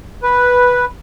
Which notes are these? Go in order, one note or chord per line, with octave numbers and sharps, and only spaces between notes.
B4